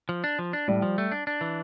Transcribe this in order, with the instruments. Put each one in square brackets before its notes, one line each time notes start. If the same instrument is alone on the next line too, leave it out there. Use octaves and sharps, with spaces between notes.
[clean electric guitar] F3
D4
F3
D4
[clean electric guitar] A2 [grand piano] G3
[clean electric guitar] F3
A3
D4
D4
E3